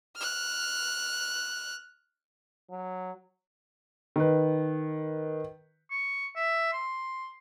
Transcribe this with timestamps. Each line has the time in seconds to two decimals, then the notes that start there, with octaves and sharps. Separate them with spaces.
0.17 F6 F#6
2.70 F#3
4.16 D#3 B4
5.91 C#6
6.36 E5
6.73 C6